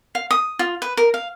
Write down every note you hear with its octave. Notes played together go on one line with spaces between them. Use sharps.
F5
D#6
F4
B4
A#4
F5